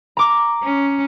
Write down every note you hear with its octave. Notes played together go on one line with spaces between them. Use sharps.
A#5 D6
C#4